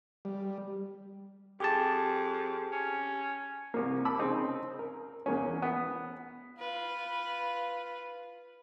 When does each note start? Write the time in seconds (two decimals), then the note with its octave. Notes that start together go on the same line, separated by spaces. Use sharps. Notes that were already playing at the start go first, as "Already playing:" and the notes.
0.25 G3
1.60 F2 G4 G#4 A5
2.72 C#4
3.74 C2 A#3
4.05 A5 B5 D6 E6
4.19 C#3 C4 D#4
4.79 A#4
5.26 E2 A#3 C#4
5.62 B3
6.59 F4 B4